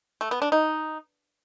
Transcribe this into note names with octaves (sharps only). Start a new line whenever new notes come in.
A3
B3
D4
D#4